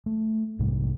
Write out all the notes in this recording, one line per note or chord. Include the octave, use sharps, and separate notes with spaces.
A3
B1 G#2 C3 G3